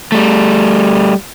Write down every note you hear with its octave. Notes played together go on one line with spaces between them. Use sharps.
G3 A3